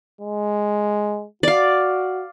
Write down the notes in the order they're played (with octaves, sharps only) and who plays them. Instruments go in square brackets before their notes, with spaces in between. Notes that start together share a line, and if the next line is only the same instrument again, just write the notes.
[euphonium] G#3
[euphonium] F#4 [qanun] D5 F5